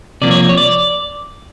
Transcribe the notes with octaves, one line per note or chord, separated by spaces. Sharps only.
C2 C3 F3 A#3 D5
C#5
C#5
D5